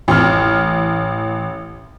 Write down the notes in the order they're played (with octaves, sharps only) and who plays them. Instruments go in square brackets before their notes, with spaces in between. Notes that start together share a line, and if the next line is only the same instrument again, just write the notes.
[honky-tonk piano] A1 F6